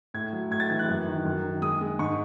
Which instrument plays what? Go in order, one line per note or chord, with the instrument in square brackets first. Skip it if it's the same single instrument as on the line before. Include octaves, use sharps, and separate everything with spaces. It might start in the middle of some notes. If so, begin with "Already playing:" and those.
[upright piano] A2 G#6
F#3
A2 G#6
A6
E3 G#6
F#6
F#2
D#3
F#2
D#3
G#3 D#6
G#3
G#2 C#6